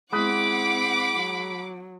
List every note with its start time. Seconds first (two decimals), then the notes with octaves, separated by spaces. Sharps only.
0.12 G#3 C4 E4 F#5 B5 D6 D#6 F#6
1.16 F#3